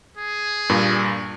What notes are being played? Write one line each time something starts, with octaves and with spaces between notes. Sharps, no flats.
G#4
G2 A#2